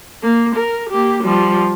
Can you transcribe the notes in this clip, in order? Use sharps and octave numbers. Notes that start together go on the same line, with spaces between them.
A#3
A#4
A#3 G4
F3 G3